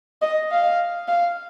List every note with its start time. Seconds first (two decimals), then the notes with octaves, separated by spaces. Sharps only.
0.22 D#5
0.51 F5
1.08 F5